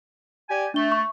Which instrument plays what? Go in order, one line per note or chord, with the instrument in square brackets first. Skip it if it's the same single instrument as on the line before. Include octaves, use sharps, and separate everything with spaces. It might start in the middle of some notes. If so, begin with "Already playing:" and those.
[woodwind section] G4 D5 G#5
[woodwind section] A3 [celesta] D4 G7
[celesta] C#6